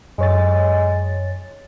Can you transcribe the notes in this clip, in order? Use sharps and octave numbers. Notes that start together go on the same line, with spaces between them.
F#2 G#3 C#5 A6